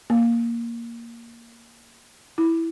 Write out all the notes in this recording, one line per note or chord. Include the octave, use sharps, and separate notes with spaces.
A#3
E4